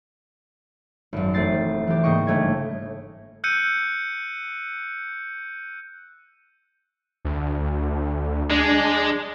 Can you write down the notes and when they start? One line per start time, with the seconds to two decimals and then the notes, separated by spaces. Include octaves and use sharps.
1.13 G#1 F#2
1.34 E1 A3 C4 A6 C7
1.87 E3 G4
2.03 G#2 C#3 A#3 D#5 G5 C#6
2.27 G1 A3 C#5 G#6
3.44 E6 F#6 G6 C#7 D#7
7.25 D2
8.51 G#3 D4